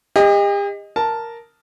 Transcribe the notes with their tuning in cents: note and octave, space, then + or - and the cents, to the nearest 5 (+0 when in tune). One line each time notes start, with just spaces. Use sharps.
G4 +45 D#5 +0
A#4 +0 A5 +0